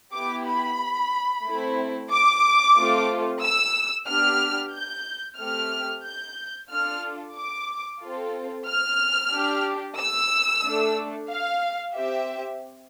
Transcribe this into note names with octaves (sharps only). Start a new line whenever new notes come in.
B3 E4 G4 D6
B5
A3 C4 E4
D6
A3 C4 F4 A4
E6
B3 D4 G4 F6
G6
A3 C4 G4 F6
G6
D4 F4 A4 F6
D6
C4 F4 A4
F6
D4 G4
E6
A3 D4 A4
F5
C4 G4 E5